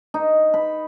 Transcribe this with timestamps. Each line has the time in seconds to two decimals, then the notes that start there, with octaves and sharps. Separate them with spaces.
0.14 D#4
0.54 B5